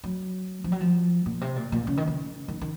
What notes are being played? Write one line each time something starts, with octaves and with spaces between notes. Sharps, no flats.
F#3
F3
F#3
F3
A#2
C3
A#2
A#2
C#3
D#3
C#3
D#3
D#3